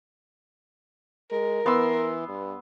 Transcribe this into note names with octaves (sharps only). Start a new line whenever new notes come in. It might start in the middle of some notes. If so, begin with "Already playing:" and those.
G#3 A#4
E3 B3 C6 E6
G2